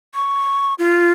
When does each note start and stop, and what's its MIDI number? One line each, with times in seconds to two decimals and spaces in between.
0.15 0.74 85
0.79 1.12 65